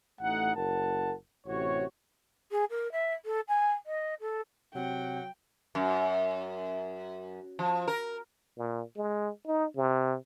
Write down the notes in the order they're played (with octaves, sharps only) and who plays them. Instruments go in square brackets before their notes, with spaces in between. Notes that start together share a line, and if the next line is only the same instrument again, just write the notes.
[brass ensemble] A1 A3 D#4 F#5
F#1 A#4 F#5 A5
A1 C3 F#4 C#5
[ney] G#4
A#4
E5
A4
G#5
D#5
A4
[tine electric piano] C3 C4 [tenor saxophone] F#3 [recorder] F#5 [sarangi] G5
[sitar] F#2
F3
A#4
[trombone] A#2
G#3
D#4
C3